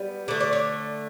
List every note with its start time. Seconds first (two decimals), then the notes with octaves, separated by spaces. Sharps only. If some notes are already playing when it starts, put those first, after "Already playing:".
Already playing: G3 B3
0.28 D3 A3 D5
0.40 D5
0.53 C#5